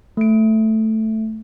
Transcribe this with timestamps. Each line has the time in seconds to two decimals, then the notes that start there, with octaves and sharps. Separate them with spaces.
0.17 A3 D7